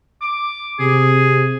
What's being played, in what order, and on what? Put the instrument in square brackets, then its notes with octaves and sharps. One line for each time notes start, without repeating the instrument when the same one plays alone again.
[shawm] D6
[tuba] C3 [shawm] G#4